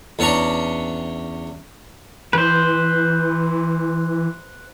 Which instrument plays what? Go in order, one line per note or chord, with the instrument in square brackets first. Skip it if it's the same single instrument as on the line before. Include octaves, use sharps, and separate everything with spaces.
[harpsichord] E2 C#4 D4 A#5 C#6
[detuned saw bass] E3 [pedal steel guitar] B4 C5